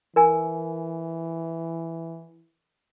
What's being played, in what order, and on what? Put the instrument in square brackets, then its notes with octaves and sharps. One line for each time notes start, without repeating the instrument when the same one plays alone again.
[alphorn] E3 [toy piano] A#4 G#5